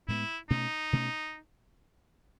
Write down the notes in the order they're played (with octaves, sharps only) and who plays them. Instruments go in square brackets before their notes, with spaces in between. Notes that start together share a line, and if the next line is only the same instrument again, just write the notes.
[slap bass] A2 G#3 B3 [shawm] E4
[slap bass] B2 A3 C#4 [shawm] D#4
[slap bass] B2 A3 C#4